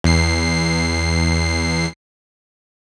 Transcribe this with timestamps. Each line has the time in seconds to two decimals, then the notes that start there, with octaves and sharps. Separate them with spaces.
0.04 E2 C7